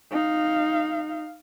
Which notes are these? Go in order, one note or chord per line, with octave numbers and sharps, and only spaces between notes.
D#4 F5